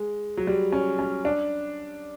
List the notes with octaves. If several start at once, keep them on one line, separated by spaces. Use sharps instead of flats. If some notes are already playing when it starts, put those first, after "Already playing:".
Already playing: G#3
F#3
G3
C#4
C#4
D4